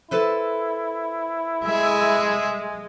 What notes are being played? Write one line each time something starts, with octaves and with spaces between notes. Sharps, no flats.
E4 A4 B4 C5
G#3 G#4 E5